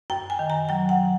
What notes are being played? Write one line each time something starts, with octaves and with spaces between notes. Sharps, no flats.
F#2 G5
G#5
D#3
A#5
F#3 G5
F#5